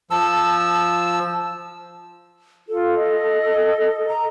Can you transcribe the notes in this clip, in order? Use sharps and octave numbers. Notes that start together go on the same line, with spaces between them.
F3 A5 E6
F4 A4
D#5
A#5